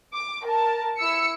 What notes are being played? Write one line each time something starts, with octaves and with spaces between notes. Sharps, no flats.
D6
A#4 A5
E4 E6 C#7